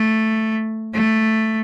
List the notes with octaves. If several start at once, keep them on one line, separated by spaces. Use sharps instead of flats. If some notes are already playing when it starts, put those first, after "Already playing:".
Already playing: A3
A3